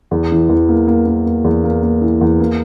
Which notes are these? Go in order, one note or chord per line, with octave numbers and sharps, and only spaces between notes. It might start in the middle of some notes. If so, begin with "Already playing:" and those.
E2
E3
E2
A#3
A#3
A#3
A#3
E2
A#3
A#3
E3
E2
A#3